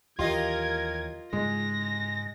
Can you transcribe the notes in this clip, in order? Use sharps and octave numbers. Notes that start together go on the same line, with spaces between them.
D#2 E3 F#3 F4 G4 A#4 D#5 G#6
G#2 C#3 G#3 A#6